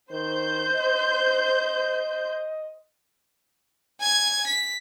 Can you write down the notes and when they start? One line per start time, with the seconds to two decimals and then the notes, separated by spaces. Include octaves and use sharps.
0.11 D#3 C5 G6
0.76 D#5
4.01 G#5 G#6
4.47 B6